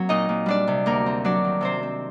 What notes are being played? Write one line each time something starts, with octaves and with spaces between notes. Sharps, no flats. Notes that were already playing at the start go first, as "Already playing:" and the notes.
Already playing: F#3 A#3 C4
A#2 D#4 D#5
A#2
G3 D4 D5
C3
D2 A#3 A#4
C4
F#3 D4 D5
D#3
C3 C4 C5
C4